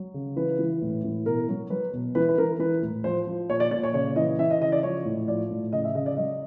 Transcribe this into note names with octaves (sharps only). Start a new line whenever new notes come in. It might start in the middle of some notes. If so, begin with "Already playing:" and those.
Already playing: F#3
C#3
E3 B4
E3
A2
E3
B2 A#4
F#3
F#3 B4
B2
E3 B4
B4
E3 A#4
E3 B4
A2
F3 C5
F3
A#2 C#5
D5
A#2 D5
C#5
C#3 C#5
E3 D#5
E3 E5
D#5
C#3 D#5
D5
F3 C#5
A2
F3 D5
A2
C#3 D#5
E5
C#3 D#5
D5
F#3 D#5